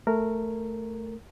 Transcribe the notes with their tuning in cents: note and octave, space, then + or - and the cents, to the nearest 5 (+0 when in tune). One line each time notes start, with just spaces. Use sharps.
A3 +0 A#4 -10